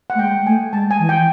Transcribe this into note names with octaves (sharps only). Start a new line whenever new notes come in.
F#5
A3
G#3 G5
A3 G#5
G#3 A5
G#5
E3
G5